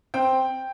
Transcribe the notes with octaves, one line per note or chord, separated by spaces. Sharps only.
C4 G5